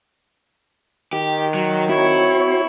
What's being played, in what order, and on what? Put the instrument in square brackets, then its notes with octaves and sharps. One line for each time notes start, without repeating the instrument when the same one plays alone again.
[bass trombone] D#3 [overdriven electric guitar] G4
[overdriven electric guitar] F#3
[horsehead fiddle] C4 C#5 [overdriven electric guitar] E4 [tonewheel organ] F#4